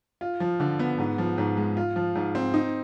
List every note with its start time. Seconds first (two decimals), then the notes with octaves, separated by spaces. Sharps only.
0.21 F4
0.40 F3
0.60 D3
0.79 B3
0.98 G#2
1.18 F3
1.38 G#2
1.57 G#3
1.77 F4
1.96 F3
2.15 G#2
2.35 C4
2.54 D#4